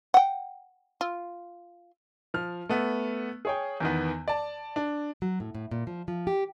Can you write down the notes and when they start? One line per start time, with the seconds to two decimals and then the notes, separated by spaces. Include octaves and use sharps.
0.14 F#5 G5
1.01 F4
2.34 F3 F6
2.69 A3 B3
3.45 G#4 C#5 G5
3.80 E2 D#3 B3
4.28 D5 A5
4.76 D4
5.22 F#3
5.40 A2
5.55 A2
5.71 A#2
5.87 F3
6.08 F3
6.27 G4